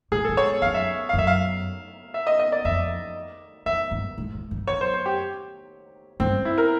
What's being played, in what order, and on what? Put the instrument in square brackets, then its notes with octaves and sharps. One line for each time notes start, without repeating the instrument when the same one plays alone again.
[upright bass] A2 [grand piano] G#4
[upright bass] G#2 [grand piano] A4
[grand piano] C#5
[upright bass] F#2 [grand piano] F5
[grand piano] E5
F5
[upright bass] F#2
[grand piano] E5
F5
E5
D#5
D#5
D5
[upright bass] F2 [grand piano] E5
[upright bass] F2 [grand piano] E5
[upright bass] G2
G#2
G#2
G2
[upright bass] F#2 [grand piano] C#5
[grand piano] C5
C5
G4
[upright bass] G2 [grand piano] C4
[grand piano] E4
A#4